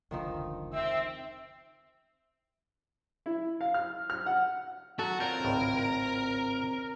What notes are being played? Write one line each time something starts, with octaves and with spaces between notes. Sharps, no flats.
F1 C#2 D3 D#3 F3 D#4
C4 E5
E4
F5
F6
F6
F#5
F#3 F#4 A4 A5
C4 F4 A#4 C#5 D5 G5 G6
G#1 C#2 A2